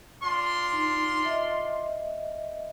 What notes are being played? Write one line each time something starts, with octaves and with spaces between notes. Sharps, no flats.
D4 F4 C6
D#4
D#5 E5